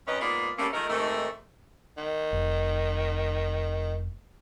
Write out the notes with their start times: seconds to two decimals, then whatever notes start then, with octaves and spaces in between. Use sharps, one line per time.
0.07 F#2 C4 C#4 D#4 B4 D#5
0.21 G#2 A#3 B3 F4 G#4 D5
0.58 G3 A3 A#3 C4 C#4
0.73 D#3 F3 G#3 A3 A#4
0.89 G#2 C3 D#3 A3
1.97 D#3
2.33 F1